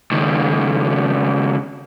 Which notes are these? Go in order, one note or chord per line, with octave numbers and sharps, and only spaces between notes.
C#2 D#3